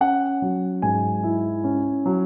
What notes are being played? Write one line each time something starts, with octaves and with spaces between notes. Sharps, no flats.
C#4 F#5
F#3
G#2 G#5
E4
C#4
F#3